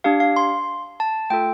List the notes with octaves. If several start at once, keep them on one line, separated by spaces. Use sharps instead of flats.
D4 G4 F5
F5
C6
A5
A3 F4 A4 G5